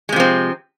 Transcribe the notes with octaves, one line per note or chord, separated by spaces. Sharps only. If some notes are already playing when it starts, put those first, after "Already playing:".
C3 F3 G#3 C4